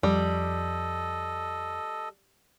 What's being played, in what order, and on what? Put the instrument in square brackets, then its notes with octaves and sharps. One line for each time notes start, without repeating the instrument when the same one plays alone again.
[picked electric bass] F2 [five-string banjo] G3 [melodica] A4 D#5